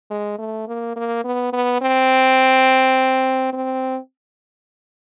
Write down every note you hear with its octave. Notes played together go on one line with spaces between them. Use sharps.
G#3
A3
A#3
A#3
B3
B3
C4
C4